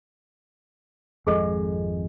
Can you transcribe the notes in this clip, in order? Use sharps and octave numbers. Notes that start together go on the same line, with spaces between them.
G#1 F2 G#3 G#4 A4 D#5